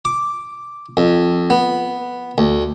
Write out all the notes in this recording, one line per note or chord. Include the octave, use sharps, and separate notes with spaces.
D6
F2
B3
D2